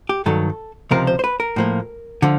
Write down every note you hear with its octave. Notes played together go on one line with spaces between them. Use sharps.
G4
G2 D#3 F#3 A4
C#2 C3 F3 A#4
C5
C5
B4
A#4
A2 F3 A#3
D3 F3